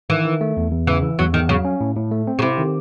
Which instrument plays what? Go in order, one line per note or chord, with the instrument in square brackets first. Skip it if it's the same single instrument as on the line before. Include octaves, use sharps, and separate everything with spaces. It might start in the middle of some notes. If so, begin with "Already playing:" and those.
[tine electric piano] D#3 [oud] E3
[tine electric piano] D#3
A3
E2
E2
[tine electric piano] C#3 [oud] E3
[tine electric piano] E3
[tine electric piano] E2 [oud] F#3
[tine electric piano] E2 [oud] D#3
[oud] C#3 [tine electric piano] F#3
[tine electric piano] C#4
A2
A2
A3
C4
[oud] C#3
[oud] C3 [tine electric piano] E4
[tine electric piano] D#3